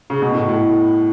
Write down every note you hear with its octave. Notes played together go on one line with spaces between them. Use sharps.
C#3
B2
A2
A2